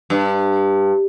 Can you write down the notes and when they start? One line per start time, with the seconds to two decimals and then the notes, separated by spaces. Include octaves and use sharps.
0.10 G2